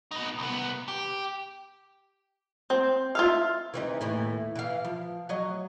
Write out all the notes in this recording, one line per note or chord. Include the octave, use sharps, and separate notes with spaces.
B3 D#4
C2 B3
G4
C4
F4 E5 F5
E3 C4 D#4
D#2 A2 E3
E3 F5
F3
F#3 C#5 D#5